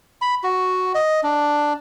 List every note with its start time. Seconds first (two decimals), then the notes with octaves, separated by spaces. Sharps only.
0.22 B5
0.43 F#4
0.95 D#5
1.23 D4